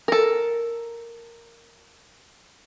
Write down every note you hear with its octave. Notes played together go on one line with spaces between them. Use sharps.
A4 A#4